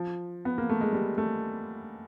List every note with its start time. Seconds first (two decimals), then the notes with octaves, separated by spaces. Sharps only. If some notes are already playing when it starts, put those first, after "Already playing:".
Already playing: F3
0.45 B3
0.58 A#3
0.70 A3
0.81 G#3
0.93 G3
1.18 A3